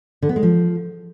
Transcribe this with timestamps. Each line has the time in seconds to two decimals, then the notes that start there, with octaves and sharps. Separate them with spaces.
0.22 D3
0.29 B3
0.36 G#3
0.43 F3